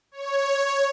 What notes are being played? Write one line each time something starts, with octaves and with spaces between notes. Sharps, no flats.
C#5